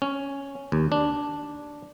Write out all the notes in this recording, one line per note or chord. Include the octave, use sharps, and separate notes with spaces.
C#4
D#2
D4